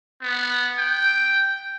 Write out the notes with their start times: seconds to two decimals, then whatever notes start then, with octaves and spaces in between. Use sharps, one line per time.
0.22 B3
0.78 G5